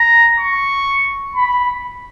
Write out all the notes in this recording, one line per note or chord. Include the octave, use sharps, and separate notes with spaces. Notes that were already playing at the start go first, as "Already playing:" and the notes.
Already playing: A#5
C#6
B5